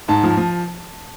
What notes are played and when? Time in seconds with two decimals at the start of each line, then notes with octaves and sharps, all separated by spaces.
0.08 G#2 A5
0.23 F3
0.37 F3